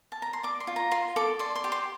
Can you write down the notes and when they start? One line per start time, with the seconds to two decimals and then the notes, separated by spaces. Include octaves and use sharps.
0.12 A5
0.22 A#5
0.33 C6
0.43 D5 D6
0.60 C6
0.67 F4
0.76 A#5
0.91 F4 C6
1.16 A4 D6
1.39 D5 C6
1.55 C6
1.64 G4
1.72 C6